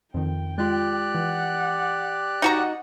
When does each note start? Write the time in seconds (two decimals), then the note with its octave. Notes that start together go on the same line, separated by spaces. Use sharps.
0.14 F2 D#3 G5
0.58 G#3 F4 G4 D5 F#6
1.14 E3 F#5
2.42 D#4 F#4 D#5 F#5 A#5